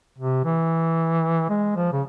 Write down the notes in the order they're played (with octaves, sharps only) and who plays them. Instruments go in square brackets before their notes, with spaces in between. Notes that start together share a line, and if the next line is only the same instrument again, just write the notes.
[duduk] C3
E3
G#3
F3
C#3